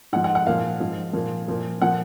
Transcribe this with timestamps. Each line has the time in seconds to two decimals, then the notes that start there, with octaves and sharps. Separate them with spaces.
0.13 G#2 F#5
0.16 F3
0.24 F#5
0.35 F#5
0.47 A#2 F3 F5
0.80 G#2 F3
1.13 A#2 F3
1.48 A#2 F3
1.82 A#2 F3 F#5